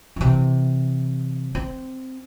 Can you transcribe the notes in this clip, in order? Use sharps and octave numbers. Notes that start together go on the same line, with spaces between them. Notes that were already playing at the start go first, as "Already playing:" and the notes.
C3 E3
C4